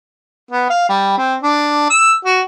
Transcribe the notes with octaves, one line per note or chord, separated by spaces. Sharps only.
B3
F5
G3
C4
D4
E6
F#4